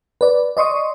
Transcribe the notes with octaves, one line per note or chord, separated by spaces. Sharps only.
B4 D5
D5 D#5 C6 C#6 D#6